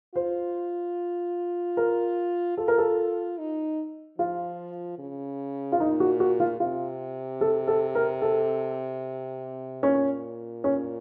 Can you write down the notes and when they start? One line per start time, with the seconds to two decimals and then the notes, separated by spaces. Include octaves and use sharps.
0.15 F4 C5
1.77 A#4
2.57 F4 A4
2.68 A#4
2.78 A4
3.38 D#4
4.18 F3 F4
4.99 C#3
5.72 F4
5.80 A#2 D#4
6.00 F#4
6.20 F#4
6.40 F4
6.60 C3 F4
7.41 A4
7.68 A4
7.95 A#4
8.22 A4
9.83 A#2 C#4
10.64 C#4